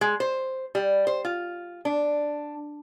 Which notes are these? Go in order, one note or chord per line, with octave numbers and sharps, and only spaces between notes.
G#3
C5
G3
C5
F4
D4